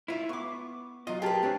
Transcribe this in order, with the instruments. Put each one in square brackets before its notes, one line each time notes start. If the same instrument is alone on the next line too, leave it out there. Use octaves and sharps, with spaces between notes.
[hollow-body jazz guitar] E4 F4
[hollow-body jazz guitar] B3 [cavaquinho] C#6 D6
[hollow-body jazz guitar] F#3 D#5 [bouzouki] F4
[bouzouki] G4 B4 [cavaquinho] G#4 A#4 A5
[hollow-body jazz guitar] C4 D4 C#5